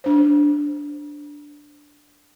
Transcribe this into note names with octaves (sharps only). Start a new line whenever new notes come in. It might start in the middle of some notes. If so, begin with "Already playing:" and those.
D4 C5